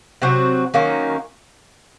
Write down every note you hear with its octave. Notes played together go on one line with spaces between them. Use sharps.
C3 F#3 C4 F#4
D#3 F#3 A#3 C#4